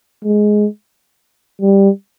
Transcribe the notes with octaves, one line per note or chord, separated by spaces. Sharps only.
G#3
G3